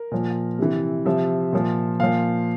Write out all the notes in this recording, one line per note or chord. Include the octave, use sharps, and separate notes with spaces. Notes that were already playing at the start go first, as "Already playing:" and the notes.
Already playing: A#4
A#2 F3
C3 E3
C3 F3 E5
A#2 F3
A#2 F3 F5